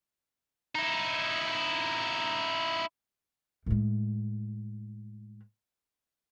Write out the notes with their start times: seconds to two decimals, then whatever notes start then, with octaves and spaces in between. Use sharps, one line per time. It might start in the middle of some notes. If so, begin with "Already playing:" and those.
0.75 D#4 E4
3.66 A2 G#3